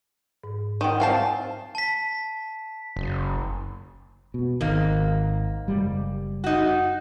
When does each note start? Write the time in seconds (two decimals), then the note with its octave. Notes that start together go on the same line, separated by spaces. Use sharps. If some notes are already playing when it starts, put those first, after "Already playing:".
0.44 G#2
0.81 D#3 F#5 G5 C6
1.00 C4 F5 G#5 A5
1.75 A5 B6
2.96 F#1
4.34 B2
4.61 G#1 G#2 D#3 A#3
5.68 F#1 G3
6.44 D#4 F#4